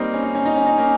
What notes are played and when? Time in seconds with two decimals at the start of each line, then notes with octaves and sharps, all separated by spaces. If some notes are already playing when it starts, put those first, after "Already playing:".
Already playing: G3 A#3 C4 D#4
0.13 C#4
0.23 D#4
0.35 C#4
0.45 D#4
0.56 C#4
0.66 D#4
0.78 A#3 C#4